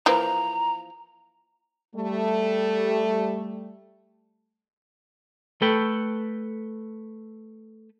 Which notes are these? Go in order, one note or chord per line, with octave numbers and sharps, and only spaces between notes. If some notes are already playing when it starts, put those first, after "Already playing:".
E3 F3 A#3 A#5
G3 A3
A3 A4 B4 G5